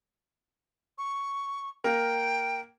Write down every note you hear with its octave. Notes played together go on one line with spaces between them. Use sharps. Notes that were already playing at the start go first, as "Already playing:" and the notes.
C#6
A#3 A#4 G5